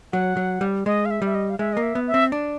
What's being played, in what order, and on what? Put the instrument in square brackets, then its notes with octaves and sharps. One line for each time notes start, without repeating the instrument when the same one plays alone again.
[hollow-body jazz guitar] F#3 [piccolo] F#5
[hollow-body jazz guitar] F#3
G3
[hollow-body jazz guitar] G#3 [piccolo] D#5
[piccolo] F5
E5
[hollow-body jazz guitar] G3 [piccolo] E5
[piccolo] D#5
F5
[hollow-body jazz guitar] G#3 [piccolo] E5
[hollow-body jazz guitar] A#3 [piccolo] D#5
[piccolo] E5
[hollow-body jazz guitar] B3
[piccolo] E5
[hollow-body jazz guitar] C4
D4